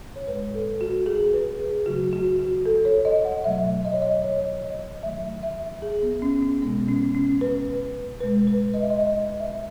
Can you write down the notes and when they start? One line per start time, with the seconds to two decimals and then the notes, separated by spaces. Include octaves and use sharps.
0.16 C#5
0.27 A2 G#3 B4
0.54 A4
0.81 F#4
1.06 G#4
1.33 B4
1.60 G#4
1.86 C#3 F#3 A3 F#4
2.13 F#4
2.39 F#4
2.66 A4
2.85 C#5
3.05 D#5
3.25 F#5
3.44 B2 F#3 A3 E5
3.85 D#5
3.93 C#5
4.02 D#5
4.24 C#5
4.64 D#5
5.03 D#3 F#3 A3 E5
5.43 E5
5.82 G#4
6.03 B3
6.22 C#4
6.42 C#4
6.61 B2 G#3 B3
6.89 C#4
7.15 C#4
7.41 B4
7.68 B4
8.20 B2 G#3 B4
8.47 B4
8.74 D#5
8.82 E5
8.90 D#5
9.00 D#5
9.19 D#5
9.40 E5